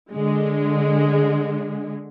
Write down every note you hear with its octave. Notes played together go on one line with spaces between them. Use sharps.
D3 G#3